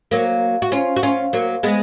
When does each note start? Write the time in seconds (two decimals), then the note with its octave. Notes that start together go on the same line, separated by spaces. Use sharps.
0.11 F#3 A#3
0.62 F#4
0.72 C#4 F4
0.96 F#4
1.03 C#4 F4
1.33 F#3 A#3
1.63 G#3 B3